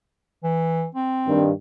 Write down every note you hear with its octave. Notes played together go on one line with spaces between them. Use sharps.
E3
C4
G2 D#3